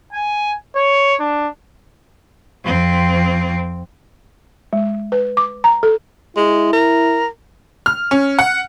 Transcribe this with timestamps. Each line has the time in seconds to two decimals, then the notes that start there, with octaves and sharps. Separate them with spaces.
0.13 G#5
0.76 C#5
1.20 D4
2.64 F2 C4
4.73 G#3
5.12 B4
5.37 D6
5.64 A#5
5.83 A4
6.37 G#3 E4
6.73 A#4
7.86 F6
8.11 C#4
8.39 F#5